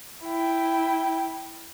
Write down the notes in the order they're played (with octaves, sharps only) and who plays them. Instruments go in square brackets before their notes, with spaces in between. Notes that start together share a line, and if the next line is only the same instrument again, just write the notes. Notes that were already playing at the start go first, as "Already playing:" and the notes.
[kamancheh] E4 G5